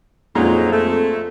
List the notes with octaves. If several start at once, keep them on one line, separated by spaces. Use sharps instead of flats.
F2 A#2 F#3 G#3 D#4
A3